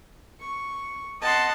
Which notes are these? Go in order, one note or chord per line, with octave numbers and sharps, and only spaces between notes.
C#6
D#5 F#5 A5 C6